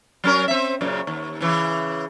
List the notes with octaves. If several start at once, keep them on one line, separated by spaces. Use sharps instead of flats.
F#3 C#4 A#4
C4 E5
F#2 A#2 C#3
D#2
C#3 E3